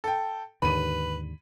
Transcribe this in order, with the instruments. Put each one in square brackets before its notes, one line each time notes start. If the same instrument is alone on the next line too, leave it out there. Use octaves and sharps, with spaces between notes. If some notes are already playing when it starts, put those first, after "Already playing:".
[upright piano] A4 G5
[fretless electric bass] D#2 G#2 D3 [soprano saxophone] B4 [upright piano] B5 D#7